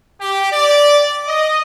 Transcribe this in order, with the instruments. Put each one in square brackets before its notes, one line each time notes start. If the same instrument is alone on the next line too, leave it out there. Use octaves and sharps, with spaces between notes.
[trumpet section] G4
D5
D#5